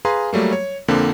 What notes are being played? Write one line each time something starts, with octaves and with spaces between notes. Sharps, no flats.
G#4 B4 F5 G#5 A#5 C6
F#3 G3 A3 A#3
C#5
F2 D3 F3 A#3 C4